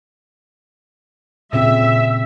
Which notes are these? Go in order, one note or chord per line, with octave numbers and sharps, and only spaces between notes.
A#2 C#3 C4 E5